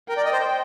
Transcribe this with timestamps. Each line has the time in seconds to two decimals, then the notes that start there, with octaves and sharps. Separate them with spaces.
0.09 A#4 G5
0.17 D5
0.25 D#5
0.33 C5